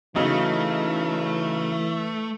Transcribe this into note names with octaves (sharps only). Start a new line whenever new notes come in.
C#3 E3 F#3 A3 D#4